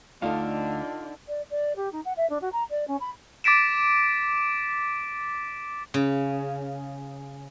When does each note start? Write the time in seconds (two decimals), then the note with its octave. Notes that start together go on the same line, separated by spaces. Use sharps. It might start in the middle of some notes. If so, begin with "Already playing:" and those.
0.22 D2 D3 A3 D4 D#4 F4 A4 F5
1.28 D5
1.50 D5
1.76 G4
1.92 D#4
2.05 F#5
2.17 E5
2.29 D4
2.41 F#4
2.52 A#5
2.70 D5
2.87 C#4
3.00 B5
3.44 D6 A6 B6 D7 E7
5.94 C#3